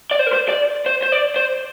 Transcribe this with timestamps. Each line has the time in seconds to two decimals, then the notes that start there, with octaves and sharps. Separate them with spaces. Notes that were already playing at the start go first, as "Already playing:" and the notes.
0.11 D5
0.19 C5
0.27 A#4
0.33 C5
0.49 D5
0.86 C5
1.03 C5
1.12 D5
1.36 C5